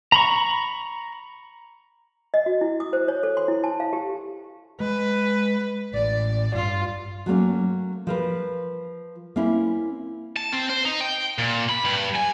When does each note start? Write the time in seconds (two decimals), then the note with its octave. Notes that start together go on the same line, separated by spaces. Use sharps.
0.12 A#5 B5 C#6
2.34 D#5
2.46 F#4
2.61 E4
2.80 D#6
2.93 C5
3.08 C#5
3.23 A4
3.37 C6
3.48 E4
3.64 A5
3.80 F5
3.93 G4
4.80 G#3 B4
5.94 A1 D5
6.55 G2 F4
7.26 F#3 A3 A#3 C#4
8.07 F3 A#4 B4
9.36 A#3 C4 C#4 E4
10.36 A5
10.52 C4
10.69 C5
10.85 D#4
11.01 G5
11.38 A#2
11.69 B5
11.85 G2
12.16 G#5